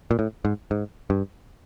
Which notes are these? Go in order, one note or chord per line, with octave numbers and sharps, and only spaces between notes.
A#2
A2
G#2
G#2
G2